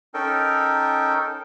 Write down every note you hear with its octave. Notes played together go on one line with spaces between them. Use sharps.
C#4 D#4 A4 A#4 G5